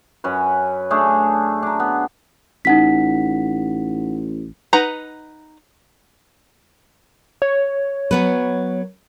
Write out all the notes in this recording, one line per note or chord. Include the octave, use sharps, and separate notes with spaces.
F#2 C#4 B4
A3 D4 G#4
D4 A#5
B3
A1 D#4 F#5 B6
D#4 B4 F#5 A#5
C#5
F#3 B3 B4